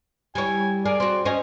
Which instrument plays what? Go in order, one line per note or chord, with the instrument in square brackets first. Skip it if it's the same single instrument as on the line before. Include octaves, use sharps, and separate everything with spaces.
[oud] G3 E4 C#5 [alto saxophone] G#5
[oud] G#4 A#4 [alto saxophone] D5
[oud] C4 F#4
C#4 C5 D#5